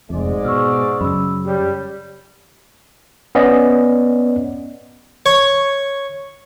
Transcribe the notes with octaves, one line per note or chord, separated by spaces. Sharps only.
F1 F2 G#2 G#3 D5
B2 C#6 E6 F6
F#2 C#3 B5 E6
G3 G4 C#5
B3 C#4 D5 D#5
C#5